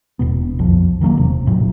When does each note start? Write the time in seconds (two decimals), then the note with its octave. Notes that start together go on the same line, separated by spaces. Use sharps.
0.19 E1 B2 B3
0.59 B1 F2 F3
1.01 D#3 F#3 A3 A#3
1.17 E1 C3
1.46 A#1 A2 F#3